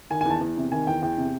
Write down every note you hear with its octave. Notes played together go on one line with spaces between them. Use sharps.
D#3 G#5
G#5
E2 A5
E2
C3
D#3 G#5
E2 G5
E2 G5
C3